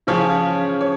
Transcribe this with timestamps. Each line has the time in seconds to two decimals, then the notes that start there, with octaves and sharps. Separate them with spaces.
0.07 C#3 F3 C#4 G#4 C#5
0.81 C#5